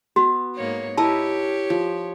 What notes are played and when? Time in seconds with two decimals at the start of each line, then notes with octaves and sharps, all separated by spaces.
0.16 B3 F#4
0.56 G#2 A#3 C#5
0.97 E4 G4 A#4 C#5 D#5 A5
1.70 F3